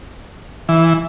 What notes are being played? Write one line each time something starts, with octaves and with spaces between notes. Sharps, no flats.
E3